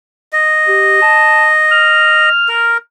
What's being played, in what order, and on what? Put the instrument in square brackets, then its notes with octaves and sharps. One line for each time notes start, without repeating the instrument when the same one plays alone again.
[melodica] D#5
[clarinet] G4
A5
F6
[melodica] A#4